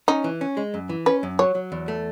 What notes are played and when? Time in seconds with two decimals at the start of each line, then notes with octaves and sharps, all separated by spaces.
0.08 C#4 D#4
0.24 E3
0.41 C#4
0.57 G#3
0.74 F#2
0.89 E3
1.06 C#4 B4
1.23 F#2
1.39 F#3 C#5
1.55 F#3
1.72 E2
1.88 A3